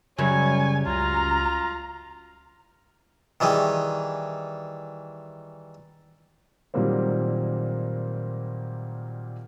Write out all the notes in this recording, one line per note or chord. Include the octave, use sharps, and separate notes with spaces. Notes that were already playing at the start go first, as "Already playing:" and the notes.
F#2 C#3 G3 C#5 G#5
C#2 F4 A#5
D#3 E3 G3 G#4
A#2 D#3 F#3 G3 A#3 C4